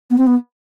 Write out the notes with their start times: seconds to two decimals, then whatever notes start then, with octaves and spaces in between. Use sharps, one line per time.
0.10 B3
0.18 C4
0.26 B3